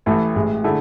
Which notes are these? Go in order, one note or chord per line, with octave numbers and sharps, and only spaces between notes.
A1 A2 E3 A3
A1 A2 G#3
D3 A3 E4 G#4